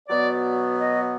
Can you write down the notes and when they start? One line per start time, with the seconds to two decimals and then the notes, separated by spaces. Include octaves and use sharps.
0.08 B2 F#3 B3 D5
0.79 D#5